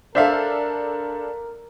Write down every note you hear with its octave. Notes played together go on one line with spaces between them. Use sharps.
D4 A4 A#4 C5 E5 F5